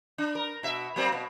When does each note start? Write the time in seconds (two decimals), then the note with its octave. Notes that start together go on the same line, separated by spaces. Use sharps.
0.18 D4
0.35 A#4
0.63 B2 E5
0.96 F#3 A#3 C4
1.12 B2